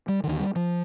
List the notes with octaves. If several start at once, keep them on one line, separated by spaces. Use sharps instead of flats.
G3
D#2 D3 D#3
G3
F3